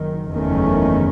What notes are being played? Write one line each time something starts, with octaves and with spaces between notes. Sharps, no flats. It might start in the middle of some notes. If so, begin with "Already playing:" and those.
Already playing: F#1 F#2 D#3
F#1 E2 D#3 A3 C#4